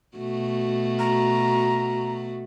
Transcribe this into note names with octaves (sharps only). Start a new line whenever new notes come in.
B2 A3 F#4
A#5